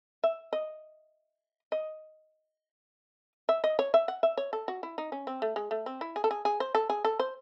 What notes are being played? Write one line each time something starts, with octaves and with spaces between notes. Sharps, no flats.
E5
D#5
D#5
E5
D#5
C#5
E5
F#5
E5
C#5
A4
F#4
E4
D#4
C#4
C4
A3
G#3
A3
C4
E4
G#4
A4
G#4
G#4
C5
A4
G#4
A4
C5